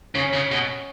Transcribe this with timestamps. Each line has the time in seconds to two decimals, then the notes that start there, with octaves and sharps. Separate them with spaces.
0.15 C#3 C#4
0.33 C#3
0.52 B2